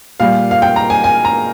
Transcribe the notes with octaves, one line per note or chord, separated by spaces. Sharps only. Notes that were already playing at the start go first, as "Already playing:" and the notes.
A#2 G3 F5
F5
G5
A#5
G#5
G#5
A#5